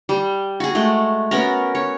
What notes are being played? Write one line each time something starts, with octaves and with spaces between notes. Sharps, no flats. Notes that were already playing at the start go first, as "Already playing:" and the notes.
G3
F#4 G#4
G#3 A3
B3 C#4 F#4 A#4
C#5